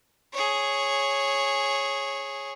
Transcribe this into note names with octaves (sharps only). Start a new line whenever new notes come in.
G#4 C#5